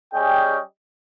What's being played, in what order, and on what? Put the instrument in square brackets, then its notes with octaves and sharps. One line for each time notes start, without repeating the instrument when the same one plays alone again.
[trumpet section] G3 C#4 G#4 D#5 G5